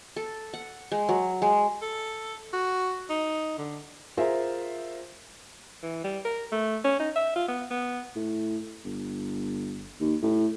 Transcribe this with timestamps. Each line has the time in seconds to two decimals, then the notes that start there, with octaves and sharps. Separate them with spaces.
0.16 A4
0.54 F#5
0.92 G#3
1.09 F#3
1.42 G#3
1.82 A4
2.53 F#4
3.10 D#4
3.58 D3
4.17 F4 G#4 A#4 C5 E5
5.83 E3
6.04 G3
6.25 A#4
6.52 A3
6.84 C#4
7.00 D#4
7.16 E5
7.36 F4
7.49 B3
7.71 B3
8.16 A2
8.84 G1
10.00 D#2
10.22 A2